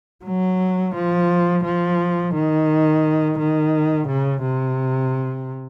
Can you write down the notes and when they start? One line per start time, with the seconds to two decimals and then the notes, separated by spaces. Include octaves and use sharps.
0.25 F#3
0.95 F3
1.65 F3
2.34 D#3
3.39 D#3
4.07 C#3
4.42 C3